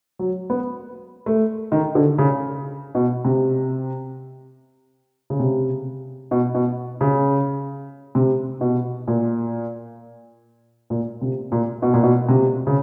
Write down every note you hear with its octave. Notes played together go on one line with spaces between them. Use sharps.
F#3
B3
A3
D#3
D3
C#3
B2
C3
C#3
C3
B2
B2
C#3
C3
B2
A#2
A#2
C3
A#2
B2
A#2
B2
C3
C#3